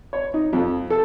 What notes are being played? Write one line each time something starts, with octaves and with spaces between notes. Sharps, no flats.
C#5
D#4
F2
A4